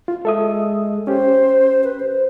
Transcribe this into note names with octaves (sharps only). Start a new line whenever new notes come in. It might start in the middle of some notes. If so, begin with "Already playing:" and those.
F4
G#3 A4 E5 D#6
C#4 G4 C5
B4
C5